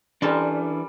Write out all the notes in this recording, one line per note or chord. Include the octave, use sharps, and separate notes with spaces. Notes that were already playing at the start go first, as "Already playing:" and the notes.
E3 G3 C#4 D4 A4 A#4 C5